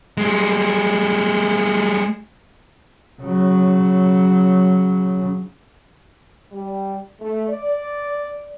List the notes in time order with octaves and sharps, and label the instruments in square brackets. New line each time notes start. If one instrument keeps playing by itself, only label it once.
[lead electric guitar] G3 G#3
[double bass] C#3 F#3
[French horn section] G3
A3
D5